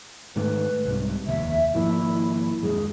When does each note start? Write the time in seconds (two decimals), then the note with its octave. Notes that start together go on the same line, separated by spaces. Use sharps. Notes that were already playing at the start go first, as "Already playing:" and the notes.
0.36 G#2 D#3 A3 B4
0.85 C2 G#2 C3
1.27 F1 D#2 E5
1.74 G#1 F3 A#3 E4
2.62 D#1 F#2 G#3 G#4